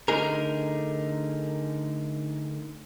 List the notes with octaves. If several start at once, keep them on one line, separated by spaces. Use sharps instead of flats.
D3 A3 D#4 G#4 A#4